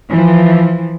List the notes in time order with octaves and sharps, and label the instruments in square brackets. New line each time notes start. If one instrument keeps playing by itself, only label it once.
[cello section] E3 F3